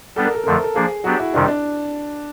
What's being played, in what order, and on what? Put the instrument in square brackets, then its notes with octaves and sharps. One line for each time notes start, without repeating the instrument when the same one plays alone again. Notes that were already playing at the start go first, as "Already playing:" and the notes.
[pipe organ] G3 B3 D4 [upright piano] A4
[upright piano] A#4
A4
[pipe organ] F2 D3 F3 A3 [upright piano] A#4
[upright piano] A4
A4
[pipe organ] F3 A#3 D4 [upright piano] G#4
[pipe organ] F#3 B3 D4 G4 [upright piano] F#4
[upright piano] E4
[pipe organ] F2 C3 D#3 G3 [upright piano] D4
[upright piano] D4